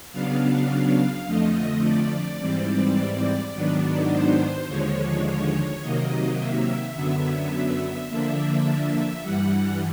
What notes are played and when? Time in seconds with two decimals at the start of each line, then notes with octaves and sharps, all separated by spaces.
0.12 C#3 F#3 B3 D4 F5
1.27 F2 D3 F3 A3 D#5
1.83 D5
2.40 G#2 E3 G3 C4
3.54 G#2 D#3 F#3 B3 D4
4.11 C5
4.68 D#2 D3 F3 G#3 C#5
5.25 C#5
5.82 C3 D#3 F#3 A#3 D#5
6.39 E5
6.95 F#2 D3 F#3 B3
8.09 D3 F3 A#3 D4 E5
9.23 G2 E3 G3 F#5